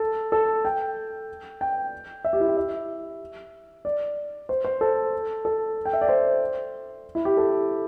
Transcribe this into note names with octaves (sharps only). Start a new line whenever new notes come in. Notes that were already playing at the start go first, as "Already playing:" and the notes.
Already playing: A4
A4
G5
G5
E5
G4
E4
G4
E5
D5
C5
C5
A4
A4
G5
E5
D5
C5
E4
G4
A4